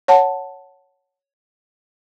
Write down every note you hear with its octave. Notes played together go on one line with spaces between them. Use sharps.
C#5 F#5 A5